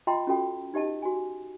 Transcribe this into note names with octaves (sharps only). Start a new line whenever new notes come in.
F4 D#5 G5 A#5 C6
C#4 F4 F#4 A4 G5
D#4 G4 D#5 A5
F#4 G#5